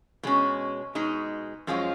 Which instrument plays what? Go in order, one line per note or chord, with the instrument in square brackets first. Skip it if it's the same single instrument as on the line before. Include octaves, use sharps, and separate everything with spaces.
[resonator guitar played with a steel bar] B2 G#3 C#4
B2 G#3 D#4
F#2 F3 G#3 C#4 F4